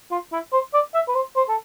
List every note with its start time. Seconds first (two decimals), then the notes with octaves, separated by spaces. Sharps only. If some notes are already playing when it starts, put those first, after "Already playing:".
0.11 F4
0.32 E4
0.53 C5
0.74 D5
0.94 E5
1.08 B4
1.15 C5
1.36 C5
1.49 A4